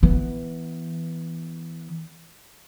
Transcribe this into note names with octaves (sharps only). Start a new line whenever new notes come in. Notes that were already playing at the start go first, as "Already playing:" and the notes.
E3 B3